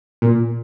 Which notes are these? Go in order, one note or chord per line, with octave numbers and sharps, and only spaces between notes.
A#2